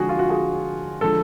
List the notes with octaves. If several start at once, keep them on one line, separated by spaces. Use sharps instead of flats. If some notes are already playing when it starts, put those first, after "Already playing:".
Already playing: D3 F3 G#3 F#4 G#4
F4
F#4
G#4
D3 F3 G#3 A4